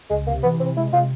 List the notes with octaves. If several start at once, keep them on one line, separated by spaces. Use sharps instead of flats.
C#2 G#3
C3 A#3
E3 B3
C3 C4
G#3 E4
C3 F4